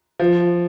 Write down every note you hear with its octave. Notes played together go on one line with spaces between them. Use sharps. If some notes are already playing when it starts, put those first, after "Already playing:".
F3